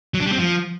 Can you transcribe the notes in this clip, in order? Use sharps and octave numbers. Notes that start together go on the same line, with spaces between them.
F#3
D4
G3
C4
F3